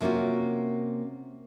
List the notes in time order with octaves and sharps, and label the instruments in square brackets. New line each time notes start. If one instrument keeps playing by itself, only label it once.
[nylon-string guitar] C3 A#3 C#4 F4 F#4